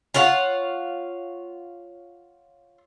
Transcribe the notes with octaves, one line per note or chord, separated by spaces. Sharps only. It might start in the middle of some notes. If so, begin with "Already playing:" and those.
F4 C#5 F5 F#5